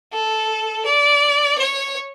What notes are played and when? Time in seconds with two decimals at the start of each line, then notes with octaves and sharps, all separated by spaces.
0.13 A4
0.85 D5
1.58 C#5